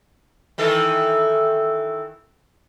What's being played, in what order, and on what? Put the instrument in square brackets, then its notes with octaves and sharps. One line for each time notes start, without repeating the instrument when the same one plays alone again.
[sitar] D#3 E3 A4